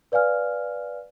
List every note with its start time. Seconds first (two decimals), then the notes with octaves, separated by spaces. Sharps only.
0.12 B4 D5 F5 G#5 F6